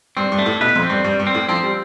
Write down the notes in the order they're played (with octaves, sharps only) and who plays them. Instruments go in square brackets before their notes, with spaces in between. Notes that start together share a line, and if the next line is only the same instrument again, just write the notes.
[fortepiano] G2 [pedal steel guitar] C4
[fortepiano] G2
[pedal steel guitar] A3
[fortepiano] A2
[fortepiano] B2 [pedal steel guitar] B4
[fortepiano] F2
[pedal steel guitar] C4
[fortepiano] G2
[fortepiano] G2 [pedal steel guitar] G3
[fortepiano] G2
[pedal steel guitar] C4
[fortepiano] A2
[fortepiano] F3 [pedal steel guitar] C4
[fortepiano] G3